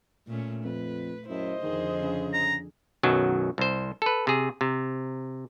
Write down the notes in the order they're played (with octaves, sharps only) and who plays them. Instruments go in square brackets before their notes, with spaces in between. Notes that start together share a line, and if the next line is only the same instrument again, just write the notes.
[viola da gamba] A#2 A3 C#4
[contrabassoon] F2 [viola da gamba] B4
[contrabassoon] F#2 [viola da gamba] E4 [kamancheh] C5 D#5
[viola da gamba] F2 D3 G#4 [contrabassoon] D#3
[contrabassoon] C#3
[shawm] A#5
[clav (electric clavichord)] B1 F#2 D#3 F#3
C2 C5
A4 B4
C3 G#4
C3